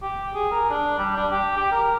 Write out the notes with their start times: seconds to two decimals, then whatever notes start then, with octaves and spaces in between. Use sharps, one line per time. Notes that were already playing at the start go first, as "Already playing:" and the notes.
0.02 G4
0.35 G#4
0.51 A#4
0.70 D4
0.98 G3
1.16 D4
1.31 G4
1.57 G4
1.72 A#4